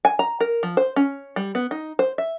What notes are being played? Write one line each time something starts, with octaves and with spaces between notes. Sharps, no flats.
G#5
A#5
A#4
F3
C5
C#4
G3
B3
D#4
C5
E5